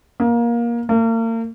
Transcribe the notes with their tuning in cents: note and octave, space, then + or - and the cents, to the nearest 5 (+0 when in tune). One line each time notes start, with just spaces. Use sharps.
A#3 +20
A#3 -40